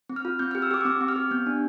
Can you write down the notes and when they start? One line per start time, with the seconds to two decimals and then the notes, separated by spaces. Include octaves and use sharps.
0.09 C4
0.16 F6
0.25 F4
0.39 C4 G6
0.51 F6
0.55 G4
0.62 E6
0.71 G4 D6
0.81 E6
0.85 C4 D6
1.01 C4
1.08 F6
1.16 G4
1.31 B3 G6
1.46 D4